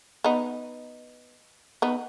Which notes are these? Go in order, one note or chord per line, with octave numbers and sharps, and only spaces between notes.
B3 D#4
B3 D#4